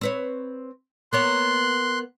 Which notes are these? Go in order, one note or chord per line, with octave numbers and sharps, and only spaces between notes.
C4 B4 C#5
A#3 B3 C#5 C6 F#6